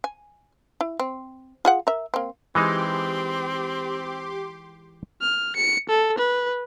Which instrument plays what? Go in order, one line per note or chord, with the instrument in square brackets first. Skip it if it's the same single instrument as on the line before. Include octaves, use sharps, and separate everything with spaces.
[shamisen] G#5
E4
C4
F4 G#4 F#5
A#4 E5
A#3 C4
[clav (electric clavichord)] E3 G#3 D#4 [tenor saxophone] C4 [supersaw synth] G4 C6 D6
[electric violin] F6
C#7
A4
B4